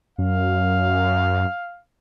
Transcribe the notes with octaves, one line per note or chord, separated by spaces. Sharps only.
F#2 F5